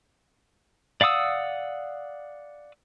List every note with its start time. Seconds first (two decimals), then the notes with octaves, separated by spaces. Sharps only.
1.01 D5 F5 F#5 D#6 E6